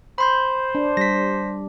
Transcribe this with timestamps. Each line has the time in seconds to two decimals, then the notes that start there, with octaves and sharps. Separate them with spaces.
0.18 C5 B5 C6 G6
0.75 D4
0.97 G3 A#6 B6